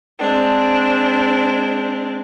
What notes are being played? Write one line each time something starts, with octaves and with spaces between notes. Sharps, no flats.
G#3 C4 D4 C5